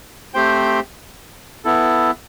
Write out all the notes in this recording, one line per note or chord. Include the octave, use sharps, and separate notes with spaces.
A3 C4 G4 C5 G5
B3 E4 A4